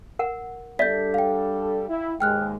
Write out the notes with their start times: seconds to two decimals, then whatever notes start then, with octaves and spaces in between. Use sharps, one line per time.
0.19 A#4 F#5
0.79 G3 D4 A4 D5 E5 G6 B6
1.14 F5 G5
1.89 E4
2.20 D#2 G#2 G#3 G5 F6 F#6